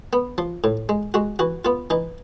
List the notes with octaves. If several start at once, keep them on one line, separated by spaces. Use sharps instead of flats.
B3
F3
A2
G#3
G#3 F#4
E3 F#4
B3 F4
E3 D#4